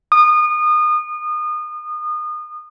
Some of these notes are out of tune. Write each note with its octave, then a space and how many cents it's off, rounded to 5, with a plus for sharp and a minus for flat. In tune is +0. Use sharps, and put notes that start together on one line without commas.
D#6 -30